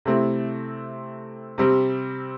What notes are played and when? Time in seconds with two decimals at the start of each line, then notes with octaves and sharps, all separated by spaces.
0.05 C3 A3 C4 E4
1.58 C3 G3 C4